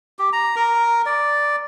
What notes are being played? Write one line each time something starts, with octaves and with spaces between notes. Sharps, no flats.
G4
A#5
A#4
D5